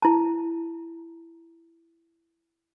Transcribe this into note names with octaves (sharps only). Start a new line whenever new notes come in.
E4 A5